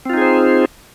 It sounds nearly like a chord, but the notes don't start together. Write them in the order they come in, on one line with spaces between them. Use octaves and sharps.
C4 F4 D#4 G#4 C5